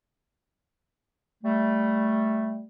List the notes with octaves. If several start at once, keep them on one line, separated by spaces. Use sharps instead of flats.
G3 A3